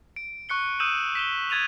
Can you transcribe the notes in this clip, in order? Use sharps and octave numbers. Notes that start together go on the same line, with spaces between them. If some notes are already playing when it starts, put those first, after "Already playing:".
D7
C#6 F#6 C#7 G7
D#6 E6 G6 D#7 E7 F#7
B6 E7 G7
C#6 G#6 A6 D#7 F7